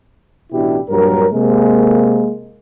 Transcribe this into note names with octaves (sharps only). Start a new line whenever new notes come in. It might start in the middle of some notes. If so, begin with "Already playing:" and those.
A1 B2 D4 E4 G4
A#1 G2 F#3 A#4
C3 G#3 A#3